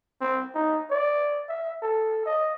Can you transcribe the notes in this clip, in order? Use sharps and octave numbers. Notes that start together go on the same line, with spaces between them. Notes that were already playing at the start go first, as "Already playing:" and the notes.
C4
D#4
D5
E5
A4
D#5